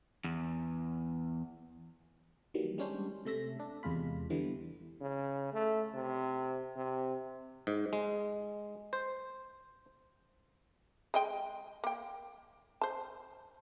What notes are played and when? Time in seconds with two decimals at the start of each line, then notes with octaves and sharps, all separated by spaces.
0.24 E2
2.54 D#3 E3 F#3 G3 A#3
2.78 G3 G#3 C#4 D4 C5
3.25 C3 A3 E5 A#6
3.60 D4
3.83 E2 C3 G#3 F4 B5
4.30 D3 E3 G3 B3
5.01 C#3
5.53 A3
5.94 C3
6.76 C3
7.67 G#2
7.93 G#3
8.93 C5
11.14 G#3 D#5 G5
11.84 A#3 G5
12.81 C5 A5